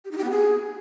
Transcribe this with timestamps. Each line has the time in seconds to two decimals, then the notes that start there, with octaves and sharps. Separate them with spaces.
0.05 G4
0.11 D#4
0.18 G4
0.24 B3
0.30 G#4